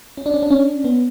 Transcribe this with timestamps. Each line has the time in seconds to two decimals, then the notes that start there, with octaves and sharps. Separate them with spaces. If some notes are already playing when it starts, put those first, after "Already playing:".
0.17 C#4
0.26 D4
0.34 C#4
0.42 D4
0.51 C#4
0.84 B3